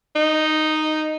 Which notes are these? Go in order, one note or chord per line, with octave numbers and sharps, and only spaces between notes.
D#4